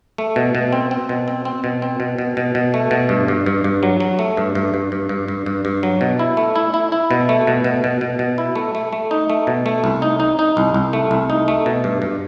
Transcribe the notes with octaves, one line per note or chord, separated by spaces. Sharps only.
A3
B2
B2
C4
C4
B2
C4
C4
B2
C4
B2
B2
B2
B2
A3
B2
G2
G2
G2
G2
F#3
F#3
A3
G2
G2
G2
G2
G2
G2
G2
G2
F#3
B2
E4
A3
E4
E4
E4
B2
A3
B2
B2
B2
B2
B2
E4
A3
A3
A3
D#4
A3
B2
A3
C2
D#4
D#4
D#4
C2
C2
A3
C2
D#4
A3
B2
G2
G2